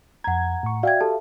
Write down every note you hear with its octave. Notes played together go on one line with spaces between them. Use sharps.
F2 F#5 A#5 G#6
A2 C#6
F#4 D5 E5 F5 G5 G#6
G4 A4 A5